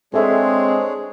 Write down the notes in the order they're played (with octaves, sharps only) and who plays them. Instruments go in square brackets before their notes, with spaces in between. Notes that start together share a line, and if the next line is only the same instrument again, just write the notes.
[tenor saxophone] G#3 [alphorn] C4 [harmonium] D4 G#4 C#5 [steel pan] A4 E5